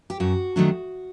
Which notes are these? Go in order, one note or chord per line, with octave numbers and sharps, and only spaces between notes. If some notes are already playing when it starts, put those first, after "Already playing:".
G4
F#2 F#4
D#3 F#3 A3 D4